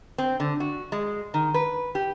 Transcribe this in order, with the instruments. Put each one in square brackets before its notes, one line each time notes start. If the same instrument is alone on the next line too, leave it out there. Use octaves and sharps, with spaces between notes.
[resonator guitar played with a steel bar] C4
D3
F#4
G#3
D#3
B4
G4